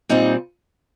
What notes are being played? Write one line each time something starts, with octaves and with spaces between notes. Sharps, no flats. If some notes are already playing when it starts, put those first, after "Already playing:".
A#2 G3 C4 D#4